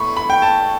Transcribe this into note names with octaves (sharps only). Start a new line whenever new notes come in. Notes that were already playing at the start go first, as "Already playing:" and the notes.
Already playing: A2 B3 B5 C#6
B5
G5
A5